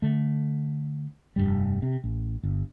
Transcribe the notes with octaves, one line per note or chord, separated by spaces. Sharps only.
D3 A3
F1 C#2 G2 G3
C3
A1
G1